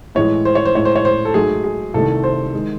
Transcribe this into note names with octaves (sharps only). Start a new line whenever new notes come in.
A2 E3 G#3 C#5
C5
C#5
C5
A2 G#3 C#5
C5
C#5
C5
A4
G#2 F#3 A3 G#4
G#4
C2 C3 D#3 A3 A4
C5
D#3 G#3